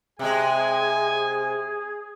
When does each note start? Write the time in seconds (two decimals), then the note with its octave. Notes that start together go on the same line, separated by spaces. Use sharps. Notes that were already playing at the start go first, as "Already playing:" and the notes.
0.19 C3 G#3 G#4 G#5